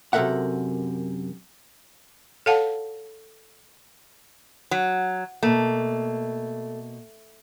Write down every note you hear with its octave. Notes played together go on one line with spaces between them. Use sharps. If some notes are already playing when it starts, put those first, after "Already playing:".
F#2 C3 A4 A#4 E5 F#5
A4 C#5 F5 F#5 A5
F#3
B2 A3 A#3